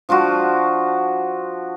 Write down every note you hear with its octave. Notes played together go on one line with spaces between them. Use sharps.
F3 D4 F4 F#4